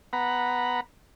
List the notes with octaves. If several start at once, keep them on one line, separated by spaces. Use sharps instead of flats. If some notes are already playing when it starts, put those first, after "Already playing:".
B3 F#5 A#5 B5